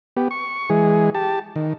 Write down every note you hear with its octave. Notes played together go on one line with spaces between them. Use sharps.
B3 G4
C#6
E3 G#3 G#4
G4 A5
D#3